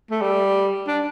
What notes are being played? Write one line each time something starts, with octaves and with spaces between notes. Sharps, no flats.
A3
G3
D4